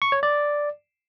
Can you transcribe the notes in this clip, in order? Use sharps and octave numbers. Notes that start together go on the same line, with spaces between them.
C#6
C#5
D5